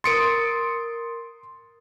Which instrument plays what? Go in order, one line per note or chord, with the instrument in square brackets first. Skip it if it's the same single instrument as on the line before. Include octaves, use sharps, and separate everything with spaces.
[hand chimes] A#4 D#6 A6 [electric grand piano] C6 C#7 D7